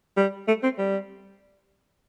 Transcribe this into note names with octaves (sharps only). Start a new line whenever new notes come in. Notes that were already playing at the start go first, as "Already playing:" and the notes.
G3
A3
C4
G3